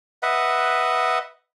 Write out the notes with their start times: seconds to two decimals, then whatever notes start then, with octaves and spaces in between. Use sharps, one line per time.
0.23 B4 D#5 E5 F#5